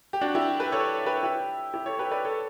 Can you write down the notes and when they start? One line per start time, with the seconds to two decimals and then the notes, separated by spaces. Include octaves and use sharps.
0.13 G4
0.21 D4 F#4
0.34 E4 G4
0.60 G4 B4
0.72 A4 C#5
1.06 G4 B4
1.23 E4 G4
1.73 E4 G4
1.86 A4 C#5
1.99 G4 B4
2.11 B4 D5
2.24 A4 C#5